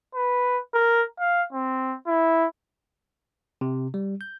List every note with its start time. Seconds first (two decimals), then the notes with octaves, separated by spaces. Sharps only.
0.15 B4
0.74 A#4
1.20 F5
1.53 C4
2.07 E4
3.61 C3
3.94 G3
4.21 G6